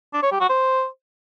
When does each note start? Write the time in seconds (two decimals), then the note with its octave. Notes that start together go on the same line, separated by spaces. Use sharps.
0.14 D4
0.23 C#5
0.31 G4
0.40 F#4
0.49 C5